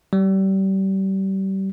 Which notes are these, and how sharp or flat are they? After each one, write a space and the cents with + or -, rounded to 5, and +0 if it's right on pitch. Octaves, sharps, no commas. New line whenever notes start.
G3 -30